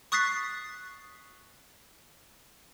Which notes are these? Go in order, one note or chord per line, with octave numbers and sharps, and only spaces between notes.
C#6 D#6 F#6 A6 B6 C7